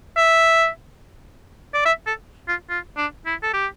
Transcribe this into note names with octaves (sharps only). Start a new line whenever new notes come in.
E5
D5
E5
A4
F4
F4
D4
E4
A4
G4